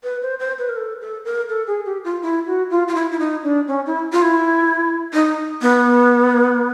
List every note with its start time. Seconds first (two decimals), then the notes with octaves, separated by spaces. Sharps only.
0.04 B4
0.22 C5
0.40 C5
0.58 B4
0.69 A#4
0.76 A4
1.01 A4
1.25 A#4
1.49 A4
1.67 G#4
1.86 G4
2.04 F4
2.22 E4
2.46 F#4
2.71 F4
2.88 F4
2.95 E4
3.11 E4
3.19 D#4
3.43 D4
3.68 C#4
3.87 E4
4.13 F4
4.22 E4
5.14 D#4
5.62 B3